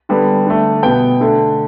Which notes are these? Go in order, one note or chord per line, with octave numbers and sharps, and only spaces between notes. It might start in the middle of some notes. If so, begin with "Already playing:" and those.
D3 G3 B3
D3 A3
B2 B3 G5
D3 A3